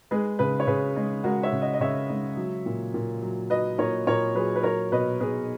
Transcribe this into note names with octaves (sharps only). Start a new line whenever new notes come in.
G#3 G#4 B4
C#3 G#4 B4
C#5
C#3 G#4 B4
G#3
G#3 F#4 A#4
C#5 E5
C#3
D#5 F#5
D#5
C#3 C#5 E5
G#3
F#3
A#2
A#2
F#3
F#3 B4 D#5
A#2 A#4 C#5
A#2 A#4 C#5
F#3 G#4 B4
B4
F#3 A#4 C#5
B2 B4 D#5
B2 G#4 B4